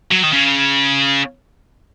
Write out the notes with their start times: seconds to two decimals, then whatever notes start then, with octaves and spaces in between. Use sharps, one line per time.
0.12 F#3
0.23 D#3
0.33 C#3